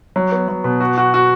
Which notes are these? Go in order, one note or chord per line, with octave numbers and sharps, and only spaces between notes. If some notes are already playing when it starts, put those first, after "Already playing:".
F#3
B3
F#3
B2
F#4
F#4
F#4